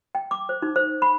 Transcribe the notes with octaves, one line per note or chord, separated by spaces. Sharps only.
G5
D6
C5
D#4
C5
B5